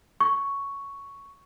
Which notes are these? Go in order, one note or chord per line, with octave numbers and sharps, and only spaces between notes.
C#6